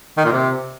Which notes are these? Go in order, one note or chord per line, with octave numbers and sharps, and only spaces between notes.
D#3
A#2
C3